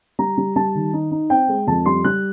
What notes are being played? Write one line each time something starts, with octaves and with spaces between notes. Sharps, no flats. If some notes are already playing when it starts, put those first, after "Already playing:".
G3 A#5
G3
G3 A5
D#3
D#4
D#4
C4 G5
G#3
F2 A5
G3 C6
G3 F#6